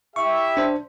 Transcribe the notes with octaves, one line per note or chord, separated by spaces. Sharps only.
E4 G4 E5 C#6
D4 C5